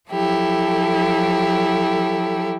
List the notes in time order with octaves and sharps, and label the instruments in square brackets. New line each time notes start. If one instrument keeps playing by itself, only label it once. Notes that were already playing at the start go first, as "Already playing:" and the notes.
[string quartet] F3 F#3 E4 G4 A4